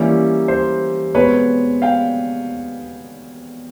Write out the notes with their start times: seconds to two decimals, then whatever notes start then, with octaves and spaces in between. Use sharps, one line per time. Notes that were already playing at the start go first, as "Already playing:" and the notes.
Already playing: E3 G3 A#3 C#4 E4
0.48 C5
1.15 B2 G#3 C4 B4 C#5
1.82 F5 G5